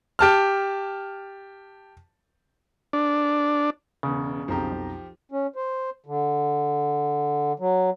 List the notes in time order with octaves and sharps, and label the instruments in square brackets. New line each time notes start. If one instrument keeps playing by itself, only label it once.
[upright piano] G4 A5 F6
[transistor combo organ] D4
[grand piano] E1 E2 [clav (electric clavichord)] C#3
[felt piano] B1 F2 A#5 [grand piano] F3 G4
[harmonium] C#4
C5
D3
F#3